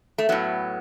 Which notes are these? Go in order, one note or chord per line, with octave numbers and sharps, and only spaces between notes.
A3
A2 F#3 B3